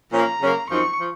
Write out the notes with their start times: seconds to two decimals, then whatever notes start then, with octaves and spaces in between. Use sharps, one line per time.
0.13 A#2 F3 A#3 C#4 A#5
0.41 C#3 F#3 A#3 C#4
0.70 F#2 F3 C4 D#4 C#6
0.99 F3